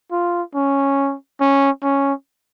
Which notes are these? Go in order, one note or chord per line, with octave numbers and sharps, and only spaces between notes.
F4
C#4
C#4
C#4